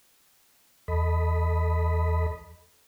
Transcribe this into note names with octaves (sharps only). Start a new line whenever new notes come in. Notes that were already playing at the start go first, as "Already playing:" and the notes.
E2 A4 D#5 B5